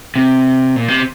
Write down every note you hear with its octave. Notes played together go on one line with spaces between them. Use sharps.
C3
A#2
C3